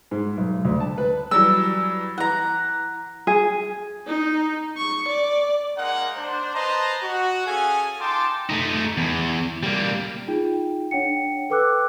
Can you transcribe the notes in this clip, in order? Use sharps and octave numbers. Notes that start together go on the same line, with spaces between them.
G#2
B1
D2
A5
B4
E3 F#3 G3 E6
E3 F#5 A#5
G#4
D#4
C#6
D5
G#3 A#3 D#4 A#4 F#5
D4 C5
B4 C5 D#5 A5 A#5 C6
F#4
C#4 G#4 A4 F5 G#5
D#4 F4 G5 A5 C6 D6
A3 D#4
E2
G3 A#3
D#4 F4 G#4 G5
D4 C#5 F#5 G5 C#7
A4 B4 G5 D6 E6 F#6